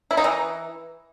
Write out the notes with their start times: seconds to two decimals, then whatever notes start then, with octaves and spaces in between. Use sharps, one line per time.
0.11 E4
0.17 D#4
0.24 E3